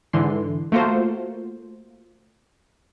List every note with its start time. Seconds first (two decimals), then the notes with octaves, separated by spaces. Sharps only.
0.13 G#2 D3 E3 C6
0.72 A3 A#3 F4 F#4 C5